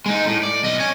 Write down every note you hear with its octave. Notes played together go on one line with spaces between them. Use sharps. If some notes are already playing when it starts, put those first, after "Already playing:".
G#3 D#4
A2
D5
B1 D#5
C#5 G#5